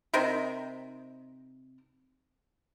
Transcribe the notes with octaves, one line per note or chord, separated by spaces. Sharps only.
C3 D#4 A#4 C5